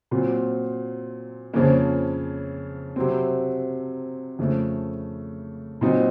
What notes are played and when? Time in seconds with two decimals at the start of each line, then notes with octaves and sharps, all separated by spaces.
0.11 A#2 F#3 C4
1.53 F2 C#3 F3 A#3 C#4
2.96 C3 F#3 C4
4.39 F2 C#3 A3
5.81 A#2 F#3 C4 D#4